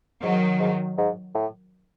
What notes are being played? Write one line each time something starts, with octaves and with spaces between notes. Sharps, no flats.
G#2 D#3 F#3
G#2
G#2
A2